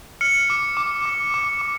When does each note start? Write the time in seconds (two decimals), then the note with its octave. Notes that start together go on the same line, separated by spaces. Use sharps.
0.21 F6 C#7
0.50 D6
0.77 D6
1.05 D6
1.34 D6
1.61 D6